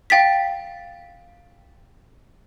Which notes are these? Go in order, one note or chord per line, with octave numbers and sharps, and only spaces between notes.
F5 G5 A6 B6